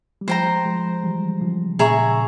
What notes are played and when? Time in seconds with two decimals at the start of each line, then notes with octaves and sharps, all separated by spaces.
0.21 G3
0.28 F3 G#3 C5 G5 A#5
0.65 F3 G#3
1.03 E3 G3
1.41 C#3 F3
1.79 A#2 C#3 G#4 E5 A#5 C#6